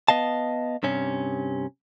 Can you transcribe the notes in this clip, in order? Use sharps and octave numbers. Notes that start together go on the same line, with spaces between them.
B3 D#5 F5 A5
G2 C3 C#4